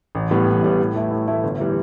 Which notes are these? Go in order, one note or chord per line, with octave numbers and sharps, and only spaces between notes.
A1
A2 G3 B3
A1
A2 G3 B3
A2
E3 A3 E4
A2
E3 A3 E4
G1
E3 G3